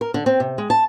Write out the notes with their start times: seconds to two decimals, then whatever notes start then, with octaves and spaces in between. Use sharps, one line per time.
0.01 A#4
0.14 D3
0.26 C4
0.40 C3
0.58 G#3
0.70 A5